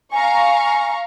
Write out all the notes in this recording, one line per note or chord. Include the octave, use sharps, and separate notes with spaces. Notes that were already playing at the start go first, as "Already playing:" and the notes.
F5 G#5 A#5 C#6